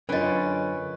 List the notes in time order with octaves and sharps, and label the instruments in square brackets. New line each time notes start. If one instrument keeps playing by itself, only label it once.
[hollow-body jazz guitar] F#2 D3 G5 [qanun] C#4 F4 [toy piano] A#4 D#5 [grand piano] B4